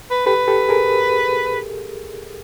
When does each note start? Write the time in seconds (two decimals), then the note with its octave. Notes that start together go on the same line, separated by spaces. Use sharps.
0.11 B4
0.26 G4 A4 B4
0.48 G4 A4
0.69 G#4 A#4